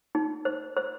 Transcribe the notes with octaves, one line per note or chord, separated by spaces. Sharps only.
D#4
C5
C5